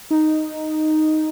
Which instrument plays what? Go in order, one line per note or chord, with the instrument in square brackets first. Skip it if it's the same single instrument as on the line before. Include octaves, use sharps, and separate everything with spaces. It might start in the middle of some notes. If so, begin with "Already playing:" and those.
[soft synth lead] D#4